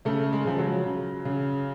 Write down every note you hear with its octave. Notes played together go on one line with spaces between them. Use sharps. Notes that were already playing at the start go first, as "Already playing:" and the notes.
C#3 A3
G#3
C#3 F3
F#3
C#3
C#3